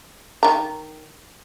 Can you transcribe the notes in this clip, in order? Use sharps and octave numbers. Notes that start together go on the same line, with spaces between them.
D#3 A#5